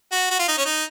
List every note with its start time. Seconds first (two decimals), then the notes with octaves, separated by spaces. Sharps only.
0.12 F#4
0.30 F#4
0.39 F4
0.48 D#4
0.57 C#4
0.65 D#4